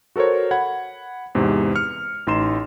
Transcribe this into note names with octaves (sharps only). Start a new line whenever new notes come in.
F#4 A4 A#4 C5 C#5
F#5 B5 G#6
E2 G#2 C3
F6 C#7
A1 D#4 C6 E7